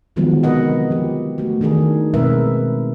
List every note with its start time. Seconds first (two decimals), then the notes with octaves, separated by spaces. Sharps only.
0.16 D3 D#3 F3 F#3 G#3 B3
0.43 C3 F#4 A#4 B4 D#5 F#5
0.91 F3 G4
1.38 A3 F#4
1.61 D#3 E3 D4 D#4 G#4 A#4
2.14 B2 G#3 C4 A#4 B4 E5